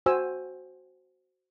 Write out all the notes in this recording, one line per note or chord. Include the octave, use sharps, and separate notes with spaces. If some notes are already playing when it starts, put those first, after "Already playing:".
F#4 C5 G#5 E6